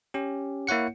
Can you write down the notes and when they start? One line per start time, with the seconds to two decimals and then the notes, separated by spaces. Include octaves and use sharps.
0.14 C#4 G4
0.67 A#3 E4 C#5 F#5 C#7